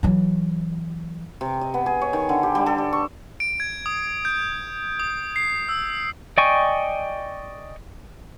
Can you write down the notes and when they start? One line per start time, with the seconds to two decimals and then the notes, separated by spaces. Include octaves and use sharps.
0.03 E3 F#3
1.41 C3
1.61 D#5
1.74 B3
1.86 G#4
2.02 C#5
2.13 D#3
2.29 D3
2.43 G4
2.55 G3
2.66 A4
2.78 D5
2.93 C#6
3.40 D7
3.60 G#6
3.86 D#6
4.25 G6
5.00 D#6
5.36 C7
5.69 E6
6.38 D5 D#5 G5 G#5 C#6